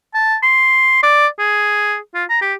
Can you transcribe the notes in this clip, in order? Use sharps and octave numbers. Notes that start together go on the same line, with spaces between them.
A5
C6
D5
G#4
F4
A#5
G4